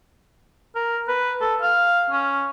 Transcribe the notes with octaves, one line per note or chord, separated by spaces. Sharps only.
A#4
B4
A4
F5
C#4